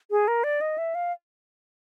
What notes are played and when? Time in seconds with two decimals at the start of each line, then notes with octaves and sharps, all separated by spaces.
0.11 G#4
0.28 A#4
0.44 D5
0.61 D#5
0.78 E5
0.95 F5